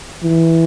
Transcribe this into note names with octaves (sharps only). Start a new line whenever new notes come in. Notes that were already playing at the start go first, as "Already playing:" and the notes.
E3